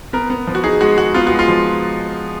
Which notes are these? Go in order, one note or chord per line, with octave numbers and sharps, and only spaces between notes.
B3 A#4
B3
F3
F#4
D#4 G#4
G#3 F#4
G#3 F#4
B3 F4
G#3 F#4
F4
F3